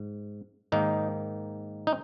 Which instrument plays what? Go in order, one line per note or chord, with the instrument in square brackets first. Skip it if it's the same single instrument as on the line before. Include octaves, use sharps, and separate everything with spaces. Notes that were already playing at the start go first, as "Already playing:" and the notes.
Already playing: [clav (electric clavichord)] G#2
G#2 D#3 A#3 D#4
D#4